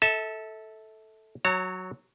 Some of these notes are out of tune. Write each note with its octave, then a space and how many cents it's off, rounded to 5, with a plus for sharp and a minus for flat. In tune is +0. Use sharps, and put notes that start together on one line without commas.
A4 +0 E5 -30 A5 +0
F#3 +0 C#5 +0 A#5 -40